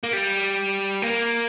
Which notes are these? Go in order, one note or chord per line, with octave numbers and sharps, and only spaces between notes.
A#3
G3
A#3